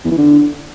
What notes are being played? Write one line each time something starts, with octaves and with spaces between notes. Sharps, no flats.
E2
E3
D3